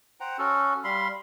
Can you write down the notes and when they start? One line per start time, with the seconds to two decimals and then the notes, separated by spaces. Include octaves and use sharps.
0.20 C5 F#5 G5 A#5
0.38 C#4 F#4 A4
0.84 G3 F5 B5 C6